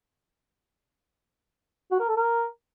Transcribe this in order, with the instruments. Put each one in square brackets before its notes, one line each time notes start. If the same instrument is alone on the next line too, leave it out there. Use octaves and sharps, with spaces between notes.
[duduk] F#4
A#4
A4
A#4